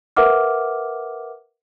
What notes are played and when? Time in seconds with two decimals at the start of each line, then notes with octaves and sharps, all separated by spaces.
0.16 A#4 B4 E5 F#5 D6 F6